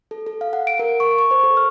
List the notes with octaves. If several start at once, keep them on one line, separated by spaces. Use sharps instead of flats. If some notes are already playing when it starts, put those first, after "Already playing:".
A4
A4
F5
F#5
D7
A#4
C#6
C#6
C5
A4
F6